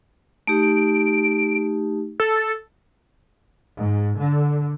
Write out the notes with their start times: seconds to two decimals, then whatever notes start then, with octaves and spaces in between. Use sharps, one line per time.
0.47 A3 D#4 G4 D7
2.20 A4
3.76 G#2
4.17 D3